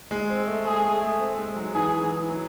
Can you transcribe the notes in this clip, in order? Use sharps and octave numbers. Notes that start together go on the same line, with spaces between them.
G#3
C4
A3
G#3 G#4
A3
A3
C4
G#3
F#3
E3 G#4
E3
F#3